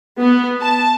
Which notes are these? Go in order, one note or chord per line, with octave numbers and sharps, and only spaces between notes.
B3
A5